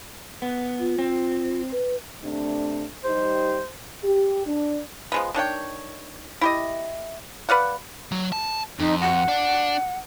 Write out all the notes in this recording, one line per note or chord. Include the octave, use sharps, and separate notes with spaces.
B3
F4
C4
B4
C3 A3 D4
G3 D#4 G4 C5
G4
D4
F3 G#3 B3
D#3 D4 C#5 G5
E4 G4 D#5
B4 D5 F5 F#5
F#3
A5
F2 D#4
F#5
D4